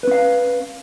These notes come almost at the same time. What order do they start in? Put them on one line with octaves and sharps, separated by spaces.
B4 C#4 F5